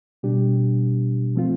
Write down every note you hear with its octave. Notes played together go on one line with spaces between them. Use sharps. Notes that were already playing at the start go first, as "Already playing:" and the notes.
B2 G3 D4 G4
F3 A3 C4 F4